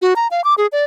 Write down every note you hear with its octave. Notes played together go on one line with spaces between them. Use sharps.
F#4
A#5
F5
D6
G#4
D5